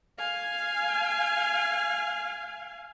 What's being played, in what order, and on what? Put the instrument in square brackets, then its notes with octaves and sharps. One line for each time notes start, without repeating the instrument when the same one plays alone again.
[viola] F5 G#5